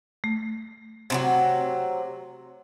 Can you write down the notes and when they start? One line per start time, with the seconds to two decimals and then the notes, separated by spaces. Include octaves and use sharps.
0.24 A3
1.10 C3 E3 F#3